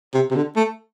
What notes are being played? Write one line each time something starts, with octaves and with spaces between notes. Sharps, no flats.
C3
C3
D3
A3